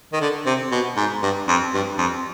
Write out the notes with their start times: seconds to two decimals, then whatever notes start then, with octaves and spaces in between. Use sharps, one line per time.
0.13 D#3
0.21 D3
0.46 C3
0.72 B2
0.97 G#2
1.23 G2
1.48 F2
1.74 G2
1.98 F2